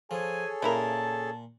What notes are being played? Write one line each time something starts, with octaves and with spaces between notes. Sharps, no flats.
F3 G#4 A4 C#5 G#5
A#2 C#3 E4 A#4 A5